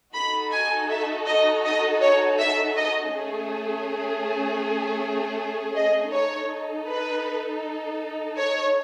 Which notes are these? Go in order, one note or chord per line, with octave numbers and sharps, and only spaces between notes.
D#4 F#4 A4 B5
G#5
E5
D#5
D#5
C#5
E5
D#5
A3 C#4 G#4
D#5
D#4 A4 C#5
B4
C#5